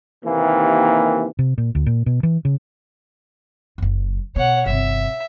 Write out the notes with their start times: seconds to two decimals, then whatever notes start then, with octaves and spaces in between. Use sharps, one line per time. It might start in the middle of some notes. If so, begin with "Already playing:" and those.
0.24 D#2 C3 D#3 E3 A#3
1.39 C3
1.58 A#2
1.75 D2
1.86 A#2
2.06 B2
2.23 E3
2.45 C#3
3.78 F#1 F#2
4.36 B2 C#5 F#5
4.66 G1 C3 E5